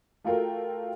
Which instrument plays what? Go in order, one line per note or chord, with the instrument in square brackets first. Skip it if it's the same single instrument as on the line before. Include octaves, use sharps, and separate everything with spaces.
[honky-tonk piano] A3 F4 F#4 A4 A#4 G5